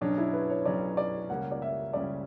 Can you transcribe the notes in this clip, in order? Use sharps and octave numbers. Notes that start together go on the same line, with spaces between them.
B1 B2 F#3 C#4 D4
E4
B4
C#5
B1 B2 F#3 C#4 D5
D5
C#2 C#3 G3 A#3 C#4 F#5
D5
E5
C#2 C#3 G3 A#3 C#4 D5